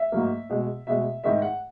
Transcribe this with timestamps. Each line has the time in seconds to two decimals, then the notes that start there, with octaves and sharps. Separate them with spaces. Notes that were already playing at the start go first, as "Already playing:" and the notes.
Already playing: E5
0.12 G#2 F#3 A#3
0.49 B2 G#3
0.87 B2 G#3 E5
1.24 G#2 D#3 G#3 E5
1.42 F#5